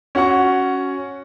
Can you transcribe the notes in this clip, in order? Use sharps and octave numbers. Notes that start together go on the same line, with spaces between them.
C#4 F#4 F#5 C#6